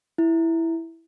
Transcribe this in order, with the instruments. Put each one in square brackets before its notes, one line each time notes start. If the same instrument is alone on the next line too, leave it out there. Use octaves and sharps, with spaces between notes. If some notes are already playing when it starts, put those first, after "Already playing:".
[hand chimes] E4